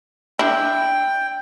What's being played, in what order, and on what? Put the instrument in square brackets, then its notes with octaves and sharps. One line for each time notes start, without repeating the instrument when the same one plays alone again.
[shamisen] D4 E4 [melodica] G5